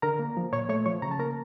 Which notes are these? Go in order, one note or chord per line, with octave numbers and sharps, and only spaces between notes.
D3 A#4 A#5
A#3
F3
A#2 C#5 C#6
A3 C#5 C#6
F3 C#5 C#6
C#3 A#5
A5
A#3 A#4 A#5